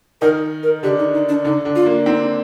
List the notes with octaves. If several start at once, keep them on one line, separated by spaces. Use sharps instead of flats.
D#3 D#4 A#4
A#4
D3 D4 G4
D#4
D#4
D4
D3 D4 D#4
D3 D4
F4
A#3
C4 D#4